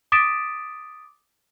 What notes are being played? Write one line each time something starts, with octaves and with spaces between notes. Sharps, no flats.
D6 D#6 A6 B6 D7 E7